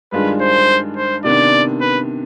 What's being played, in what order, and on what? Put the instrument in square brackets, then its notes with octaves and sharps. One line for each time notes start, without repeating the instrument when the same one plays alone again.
[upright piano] G2 D#3 G#3 D4 F4 [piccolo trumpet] B4
[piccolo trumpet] C5
C5
[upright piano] C3 D#3 B3 D4 [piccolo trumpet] D5
[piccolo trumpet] B4